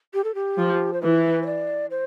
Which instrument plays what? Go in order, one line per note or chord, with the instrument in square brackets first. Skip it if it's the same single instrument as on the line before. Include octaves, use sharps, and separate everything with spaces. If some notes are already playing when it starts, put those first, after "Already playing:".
[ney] G4
A4
G4
[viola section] F3
[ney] C5
[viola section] E3 [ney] B4
[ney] C5
D5
C5